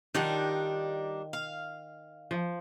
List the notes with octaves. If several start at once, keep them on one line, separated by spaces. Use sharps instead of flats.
D#3 G3 D4 D#4 F4 F#5
F5
F3